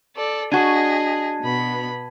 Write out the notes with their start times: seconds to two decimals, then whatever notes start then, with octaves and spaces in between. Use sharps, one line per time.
0.15 A4 D5
0.52 D4 F#4 G#4 D#5 A5 G#6 D#7
1.42 B2 B3 B5